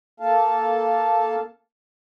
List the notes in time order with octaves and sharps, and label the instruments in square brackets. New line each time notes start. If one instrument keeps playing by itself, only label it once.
[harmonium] A#3 A4 F5 A5